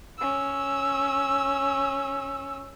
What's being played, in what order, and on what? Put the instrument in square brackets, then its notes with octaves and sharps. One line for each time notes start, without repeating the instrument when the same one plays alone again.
[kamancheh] C#4 E6